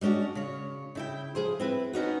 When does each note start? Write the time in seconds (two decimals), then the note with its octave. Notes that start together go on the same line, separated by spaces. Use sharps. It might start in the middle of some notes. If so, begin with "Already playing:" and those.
0.01 G3 G#3 C#4 D4 F#4
0.35 C#3 C#5
0.95 C#3 E4 G5
1.35 F3 G#4 C5
1.60 C4 E4 B4
1.93 B3 C#4 D#4 F#4